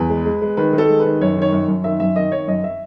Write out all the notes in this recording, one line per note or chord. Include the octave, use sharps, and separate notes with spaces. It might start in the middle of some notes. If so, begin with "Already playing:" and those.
Already playing: E2 B4
G#3
G#3
G#3
D#3 B4
D#3
A4
G#3
B4
D#3
F#2 C#5
D#3 C#5
F#2
F#2
D#3 E5
F#2 E5
D#3 D#5
D#3 C#5
F#2 D#5
E5